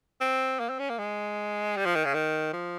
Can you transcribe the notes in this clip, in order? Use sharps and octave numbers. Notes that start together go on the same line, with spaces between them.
C4
A#3
C4
C#4
A#3
G#3
G3
F3
D#3
C#3
D#3
F3